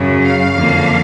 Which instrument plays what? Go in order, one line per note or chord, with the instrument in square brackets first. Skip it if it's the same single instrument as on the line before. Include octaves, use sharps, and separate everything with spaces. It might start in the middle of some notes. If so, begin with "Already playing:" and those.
Already playing: [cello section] F#2 C#3 F#3
F5
F2 D3 F3 A#3